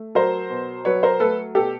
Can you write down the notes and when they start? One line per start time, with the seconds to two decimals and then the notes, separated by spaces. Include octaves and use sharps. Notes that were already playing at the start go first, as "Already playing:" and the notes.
Already playing: A3
0.15 F#3 A#4 C5
0.50 B2
0.85 F#3 B4 C#5
1.03 A#4 C5
1.20 A3 A4 B4
1.55 B2 G4 A4